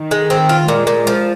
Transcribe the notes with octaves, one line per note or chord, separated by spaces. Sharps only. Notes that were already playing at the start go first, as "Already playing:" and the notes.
Already playing: D#3
G#3
C4
F4
A#2 G#3
A#2
F3